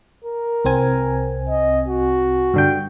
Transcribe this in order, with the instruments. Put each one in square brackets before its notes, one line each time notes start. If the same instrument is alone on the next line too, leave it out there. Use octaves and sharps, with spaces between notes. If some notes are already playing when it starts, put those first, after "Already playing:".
[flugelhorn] A#4
[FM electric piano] C2 C4 G#5
[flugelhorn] D#5
F#4
[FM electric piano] G2 D3 G5